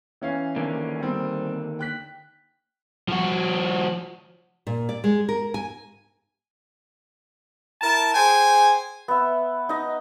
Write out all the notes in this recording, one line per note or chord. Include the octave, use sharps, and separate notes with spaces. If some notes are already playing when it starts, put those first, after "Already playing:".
E3 C#4 F5
D3 D#3 A#3
G3 C4
G5 F#6 B6
F3 F#4
A#2
D5
G#3
A#4
G#5
E4 A#4 A5
G#4 C5 G5 G#5
B3 E5
D#4 D#5